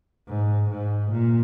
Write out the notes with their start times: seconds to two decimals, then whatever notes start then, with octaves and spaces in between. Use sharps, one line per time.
0.28 G#2
0.70 G#2
1.11 A#2